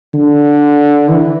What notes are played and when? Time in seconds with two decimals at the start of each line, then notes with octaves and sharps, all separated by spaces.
0.14 D3
1.09 E3